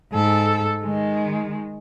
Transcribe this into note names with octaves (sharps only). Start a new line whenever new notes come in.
G#2 A4
D#3 G#3